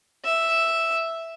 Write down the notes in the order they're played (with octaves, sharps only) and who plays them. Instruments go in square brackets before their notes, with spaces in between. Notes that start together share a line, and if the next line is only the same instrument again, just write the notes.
[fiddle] E5